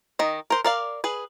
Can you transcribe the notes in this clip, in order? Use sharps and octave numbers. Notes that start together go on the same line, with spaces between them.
D#3 D#5
A#4 C5
A#4 D5 F5
G#4 B4